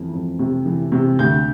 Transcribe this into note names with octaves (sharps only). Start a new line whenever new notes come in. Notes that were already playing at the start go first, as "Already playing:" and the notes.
Already playing: F2 E3
F2
C3
E3
C3
D2 G6